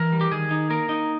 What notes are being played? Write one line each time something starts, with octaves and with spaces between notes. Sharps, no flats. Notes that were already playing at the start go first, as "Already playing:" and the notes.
Already playing: E3 A#4
G3
G4
D#3 G#4
D#4
A#3 A#4
D#4